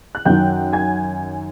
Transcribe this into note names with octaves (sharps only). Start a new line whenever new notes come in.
F#6
F#2 D#3 F#3 G5 G6
G#5 G#6